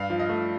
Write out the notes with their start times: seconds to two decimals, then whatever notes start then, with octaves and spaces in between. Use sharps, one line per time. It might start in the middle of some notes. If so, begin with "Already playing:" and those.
Already playing: G2 F5
0.10 F3
0.20 D#5
0.29 A3